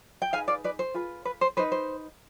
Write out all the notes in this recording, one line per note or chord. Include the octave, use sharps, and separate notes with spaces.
G5
D#4 G#4 B4 F5 G#5
D5 F5
B4 D5
C5
F4 G#4 B4
B4
C5
D#4 B4 C5
C5